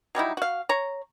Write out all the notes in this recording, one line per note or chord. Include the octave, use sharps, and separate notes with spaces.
F#3 G3 D#4 E4
F#4 F5
C#5 A#5